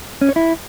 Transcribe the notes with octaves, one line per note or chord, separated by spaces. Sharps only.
C#4
C#5
E4